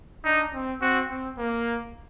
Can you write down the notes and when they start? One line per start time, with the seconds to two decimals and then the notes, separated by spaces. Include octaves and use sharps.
0.24 D4 D#4
0.54 C4
0.81 C4 F#4
1.10 C4
1.38 A#3